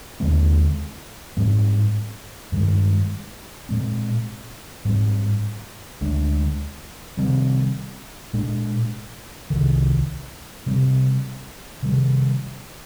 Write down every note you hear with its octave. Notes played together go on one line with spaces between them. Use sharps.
D#2 D3 G#3 C4
G#2 G3 C4
G2 D#3 G#3
A#2 G#3 C4
G#2 G3 C4
D2 D3 G#3 D4
C3 D#3 G3 C4
A#2 G#3 D4
C2 C3 D#3
C3 G3 C4
C3 D#3 G3